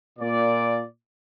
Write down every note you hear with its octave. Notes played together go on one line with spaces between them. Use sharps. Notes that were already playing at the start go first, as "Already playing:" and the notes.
A#2 D5